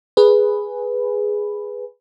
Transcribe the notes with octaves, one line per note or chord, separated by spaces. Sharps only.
G#4 B4